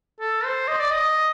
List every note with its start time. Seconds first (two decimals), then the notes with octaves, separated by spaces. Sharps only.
0.20 A4
0.44 C5
0.68 D#5
0.80 D5
0.91 D#5